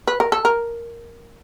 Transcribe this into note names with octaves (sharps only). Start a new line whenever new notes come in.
B4
A#4
A4
A#4